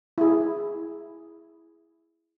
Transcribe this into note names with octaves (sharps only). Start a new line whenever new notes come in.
E4 G#4